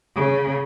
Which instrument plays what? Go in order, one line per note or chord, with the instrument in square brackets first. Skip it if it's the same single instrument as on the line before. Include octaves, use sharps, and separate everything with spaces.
[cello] C#3